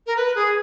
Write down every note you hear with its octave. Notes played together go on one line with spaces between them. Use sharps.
A#4
B4
G#4